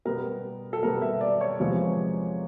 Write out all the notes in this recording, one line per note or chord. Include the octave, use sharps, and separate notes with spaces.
B2 G3 B3 A#4
A4
B2 G3 B3 A#4
E5
D5
C#5
E2 C3 F3 G#3 B3